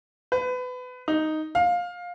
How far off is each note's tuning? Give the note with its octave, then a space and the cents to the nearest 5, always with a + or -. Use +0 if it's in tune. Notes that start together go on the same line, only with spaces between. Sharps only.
B4 +25
D#4 +0
F5 +15